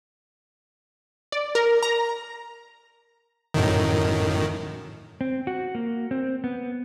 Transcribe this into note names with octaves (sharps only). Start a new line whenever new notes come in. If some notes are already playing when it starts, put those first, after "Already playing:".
D5
A#4
A#5
F#2 A2 D#3
C4
F#4
A#3
C4
B3